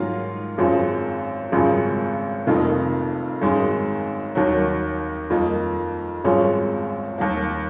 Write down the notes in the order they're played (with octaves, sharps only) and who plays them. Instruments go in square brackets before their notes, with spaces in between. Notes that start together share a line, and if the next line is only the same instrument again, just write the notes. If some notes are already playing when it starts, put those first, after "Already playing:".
Already playing: [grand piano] G#2 D#3 F#3 A#3 F4
G#1 F#2 F3 G#3
G#1 F#2 C#3 F3 G#3
F1 F2 D#3 A#3 D#4
G#1 F#2 D#3 G#3
D#2 D#3 F#3
F2 D#3 A#3 D#4
G#1 F#2 F3 G#3 C#4
D#2 D#3 A#3